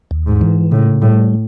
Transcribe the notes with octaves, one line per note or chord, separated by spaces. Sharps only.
D#2
G#2
E3
A2 C#3
A2 G3